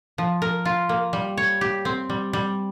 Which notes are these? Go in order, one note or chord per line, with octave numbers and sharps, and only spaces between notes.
F3
A#4
F4
A#3
G3
C#5
G4
C4
G3
G3